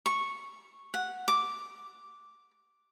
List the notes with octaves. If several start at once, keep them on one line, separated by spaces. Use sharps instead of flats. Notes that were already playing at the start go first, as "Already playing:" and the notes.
C#6
F#5
D6